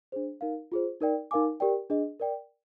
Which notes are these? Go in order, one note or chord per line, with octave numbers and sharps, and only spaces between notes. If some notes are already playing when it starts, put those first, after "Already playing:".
D4 G#4 C5
D#4 A#4 F5
F4 G#4 C5
D#4 A#4 D5 G5
D#4 A#4 F5 G#5 D6
G4 A#4 D5 G5
D4 G#4 D#5
A#4 D5 G5